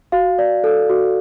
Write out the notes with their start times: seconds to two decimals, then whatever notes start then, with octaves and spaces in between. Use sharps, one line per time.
0.12 F#4 F5
0.39 D5
0.64 A4
0.89 F#4